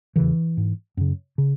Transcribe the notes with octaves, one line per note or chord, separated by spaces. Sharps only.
E2 C#3 E3
G#2
F#2 C#3
C#3